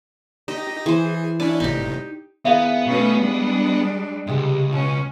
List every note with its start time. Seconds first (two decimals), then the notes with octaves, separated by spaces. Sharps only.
0.48 D#4 G4 D#5 A#6
0.86 E3 G#4 C5
1.40 C#4 D4 E4 D5
1.60 G1 A2 C3 D#4 G4
2.45 D#3 B3 E4 G#4 E5 F5
2.86 B2 A3 C#4
3.19 G3 G#3 D4
4.27 C#2 G#2 C3 G#3 G4
4.73 B2 C#4